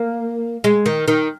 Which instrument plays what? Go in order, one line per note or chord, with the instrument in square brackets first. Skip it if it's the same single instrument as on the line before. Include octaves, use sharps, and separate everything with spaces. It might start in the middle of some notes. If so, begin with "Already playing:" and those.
Already playing: [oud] A#3
G#3
D#3
D#3